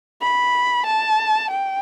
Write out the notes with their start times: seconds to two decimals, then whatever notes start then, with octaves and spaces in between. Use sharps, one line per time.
0.22 B5
0.86 A5
1.50 G5